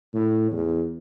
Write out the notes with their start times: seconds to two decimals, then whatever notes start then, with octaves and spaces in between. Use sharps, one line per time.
0.14 A2
0.51 E2